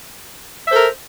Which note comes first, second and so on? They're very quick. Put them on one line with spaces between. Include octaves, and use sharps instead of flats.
E5 C5 A4 A#4